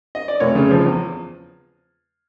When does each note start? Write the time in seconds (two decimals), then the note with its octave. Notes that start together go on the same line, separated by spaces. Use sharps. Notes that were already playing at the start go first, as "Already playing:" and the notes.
0.15 D#5
0.28 D5
0.40 F1 C#5
0.55 C#3
0.71 F3
0.85 E2